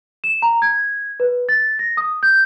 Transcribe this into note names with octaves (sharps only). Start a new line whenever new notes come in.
E7
A#5
G#6
B4
A6
A#6
D#6
G6